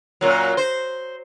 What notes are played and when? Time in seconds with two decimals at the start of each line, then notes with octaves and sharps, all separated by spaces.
0.21 F#2 A#2 F#3
0.57 C5